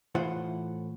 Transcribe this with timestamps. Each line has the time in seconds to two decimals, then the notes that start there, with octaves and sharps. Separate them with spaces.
0.15 A2 E3 F4 C5 F#5